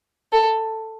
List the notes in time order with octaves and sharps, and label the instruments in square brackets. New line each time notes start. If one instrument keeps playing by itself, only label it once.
[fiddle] A4